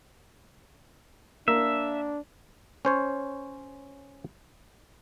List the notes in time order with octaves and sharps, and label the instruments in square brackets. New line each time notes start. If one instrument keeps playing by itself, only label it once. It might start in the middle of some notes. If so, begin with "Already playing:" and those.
[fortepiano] A#3 [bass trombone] D4 [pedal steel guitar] E5
[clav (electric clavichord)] C#4 C5 C#5